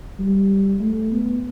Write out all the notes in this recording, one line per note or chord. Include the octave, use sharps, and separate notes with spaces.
G3
A3
B3